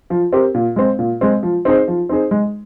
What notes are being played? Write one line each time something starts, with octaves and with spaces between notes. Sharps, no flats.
F3
C4 G4 A#4
A#2
G#3 C4
A#2
G#3 C4
F3
C4 D#4 G#4 C5
F3
C4 D#4 G#4 C5
G#3